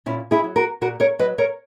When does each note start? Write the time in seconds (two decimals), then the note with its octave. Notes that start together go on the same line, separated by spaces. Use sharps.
0.06 A#2 C#4 E4
0.31 E4 G#4
0.44 F#3
0.56 F#4 A#4
0.81 A#2 F#4 A#4
1.00 A#4 C#5
1.19 F#3 B4 D#5
1.38 A#4 C#5